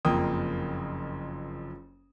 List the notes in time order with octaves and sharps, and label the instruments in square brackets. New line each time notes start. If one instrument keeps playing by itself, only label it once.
[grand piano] F#1 F2 A#3 G5 D#6